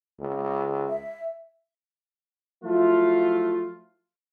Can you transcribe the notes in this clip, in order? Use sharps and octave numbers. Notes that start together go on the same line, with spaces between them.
C#2
E5
F3 F#3 A3 E4 F4